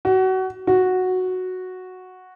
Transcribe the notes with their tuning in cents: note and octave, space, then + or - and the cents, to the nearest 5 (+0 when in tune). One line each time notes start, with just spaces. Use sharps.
F#4 +25
F#4 -5